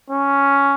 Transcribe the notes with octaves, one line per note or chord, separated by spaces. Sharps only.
C#4